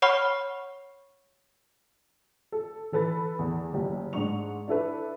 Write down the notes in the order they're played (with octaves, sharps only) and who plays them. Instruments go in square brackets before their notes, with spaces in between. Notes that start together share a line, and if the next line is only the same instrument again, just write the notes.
[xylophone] C#5 F#5 B5 C#6 F6
[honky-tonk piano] A4
E3 A4 B4 B5 A6
E2
F#1 G4
G#2 D4 C#6 F7
D4 E4 A4 B4